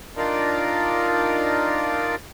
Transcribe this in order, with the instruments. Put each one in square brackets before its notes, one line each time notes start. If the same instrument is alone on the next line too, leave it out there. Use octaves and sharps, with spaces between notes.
[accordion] D4 D#4 F4 A#4 D5